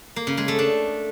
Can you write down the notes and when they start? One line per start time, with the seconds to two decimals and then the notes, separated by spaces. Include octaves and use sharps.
0.16 A#3
0.27 C#3
0.37 G#3
0.48 A3
0.59 D4